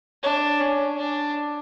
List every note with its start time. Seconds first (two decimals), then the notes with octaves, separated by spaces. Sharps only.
0.23 D4
0.60 C#4
0.98 D4